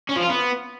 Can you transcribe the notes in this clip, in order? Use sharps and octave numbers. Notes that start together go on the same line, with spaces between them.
C#4
F3
F4
B3